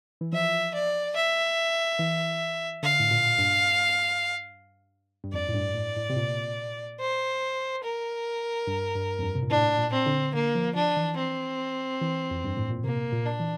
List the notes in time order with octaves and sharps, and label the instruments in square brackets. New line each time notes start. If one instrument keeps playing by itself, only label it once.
[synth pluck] E3
[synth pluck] F3 [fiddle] E5
[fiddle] D5
E5
[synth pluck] E3
[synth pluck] D3 [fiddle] F5
[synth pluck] A2
A#2
G2
G2
[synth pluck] F2 [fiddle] D5
[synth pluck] A2
G2
A2
A2
C3
A#2
[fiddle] C5
A#4
[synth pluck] G2
G2
F2
G2
C3
A#2
[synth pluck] A2 [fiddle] D4
[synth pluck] A#2
[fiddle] C4
[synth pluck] D3
[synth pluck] D3 [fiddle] A#3
[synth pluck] F3
[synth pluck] F3 [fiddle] D4
[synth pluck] E3
[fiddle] C4
[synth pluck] E3
F2
G2
A2
A#2
[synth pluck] C3 [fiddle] A#3
[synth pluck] A#2
[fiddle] D4
[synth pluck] E3